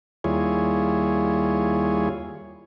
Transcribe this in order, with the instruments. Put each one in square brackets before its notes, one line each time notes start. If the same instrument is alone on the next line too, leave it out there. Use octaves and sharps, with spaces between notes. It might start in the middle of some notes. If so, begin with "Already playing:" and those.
[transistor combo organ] D#2 G3 E4 F4 G#4 C#5